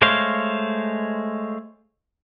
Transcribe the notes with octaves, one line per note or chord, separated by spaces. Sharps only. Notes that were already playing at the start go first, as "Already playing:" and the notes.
G#3 A3 C5 C#5 F5